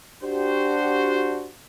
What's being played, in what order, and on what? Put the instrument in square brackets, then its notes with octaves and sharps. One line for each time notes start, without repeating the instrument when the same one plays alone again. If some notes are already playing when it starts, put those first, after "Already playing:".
[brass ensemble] D4 F#4 G4 C5